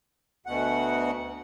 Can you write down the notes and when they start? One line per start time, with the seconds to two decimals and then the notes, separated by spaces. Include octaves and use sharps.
0.46 D2 B2 F#5